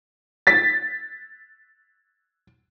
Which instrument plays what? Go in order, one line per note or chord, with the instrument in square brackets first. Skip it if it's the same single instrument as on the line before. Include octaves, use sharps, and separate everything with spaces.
[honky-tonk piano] A6 B6